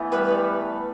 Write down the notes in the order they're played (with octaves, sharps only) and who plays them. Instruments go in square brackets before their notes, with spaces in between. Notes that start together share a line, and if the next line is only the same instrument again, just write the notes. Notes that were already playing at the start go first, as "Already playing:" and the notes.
Already playing: [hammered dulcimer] E3 A3 B3
[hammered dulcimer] G3 [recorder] B4
[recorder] B4
[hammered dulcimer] G3